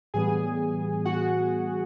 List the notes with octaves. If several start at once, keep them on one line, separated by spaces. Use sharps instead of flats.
A2 E3 G3 B3 G#4 G#5
F#4 F#5